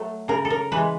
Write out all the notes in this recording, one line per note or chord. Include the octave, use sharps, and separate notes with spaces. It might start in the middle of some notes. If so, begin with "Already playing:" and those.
Already playing: F#3 A3
C#3 A#4
A4
A#4
E3 G#3 B4